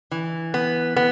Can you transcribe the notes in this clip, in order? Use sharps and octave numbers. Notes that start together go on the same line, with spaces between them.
E3
B3
B3